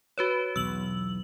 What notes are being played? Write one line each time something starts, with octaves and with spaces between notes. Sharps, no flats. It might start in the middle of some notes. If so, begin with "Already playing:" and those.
F#4 B4 C#5
B1 E2 E6 F#7